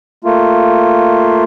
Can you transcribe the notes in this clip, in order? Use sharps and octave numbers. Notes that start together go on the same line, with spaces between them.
A3 A#3 F4